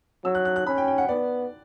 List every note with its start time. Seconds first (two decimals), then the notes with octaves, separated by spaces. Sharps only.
0.24 F#3 E6
0.35 F#6
0.45 F#6
0.56 F#6
0.66 C#4 B5
0.78 G5
0.88 G5
0.98 F#5
1.09 B3 D5